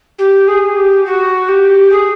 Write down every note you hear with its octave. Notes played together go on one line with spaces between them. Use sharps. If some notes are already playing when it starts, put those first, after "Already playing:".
G4
G#4
G4
F#4
G4
G#4